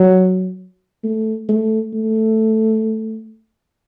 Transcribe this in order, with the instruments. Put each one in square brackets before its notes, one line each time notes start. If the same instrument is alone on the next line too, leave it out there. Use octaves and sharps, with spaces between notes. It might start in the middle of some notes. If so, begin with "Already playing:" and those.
Already playing: [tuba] F#3
A3
A3
A3